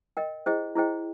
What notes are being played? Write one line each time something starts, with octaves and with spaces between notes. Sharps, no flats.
A#4 D#5 G5
E4 G#4 C5 D#5 G5
E4 G#4 C5 D#5 G5